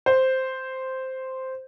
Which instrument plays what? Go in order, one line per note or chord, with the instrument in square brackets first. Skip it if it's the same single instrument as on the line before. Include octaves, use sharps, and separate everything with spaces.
[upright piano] C5